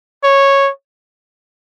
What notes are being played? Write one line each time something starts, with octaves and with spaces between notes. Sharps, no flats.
C#5